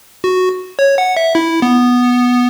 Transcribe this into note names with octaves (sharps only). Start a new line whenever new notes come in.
F#4
C#5
F#5
E5
E4
B3